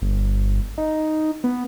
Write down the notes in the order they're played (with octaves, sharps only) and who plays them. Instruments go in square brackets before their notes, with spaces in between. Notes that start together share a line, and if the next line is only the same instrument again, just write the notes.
[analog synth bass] G1
D#4
B3